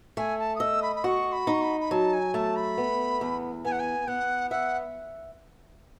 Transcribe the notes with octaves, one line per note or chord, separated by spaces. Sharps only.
A3 G#5
A5
D#6
D#5 E6
B5
B5
F#4 C#6
B5
D#4
C#6
B5
B5
F#3 A5
G#5
A3 A5
B5
B3
E2
B3 G#5
F#5
G#5
B3 F#5
E5 F#5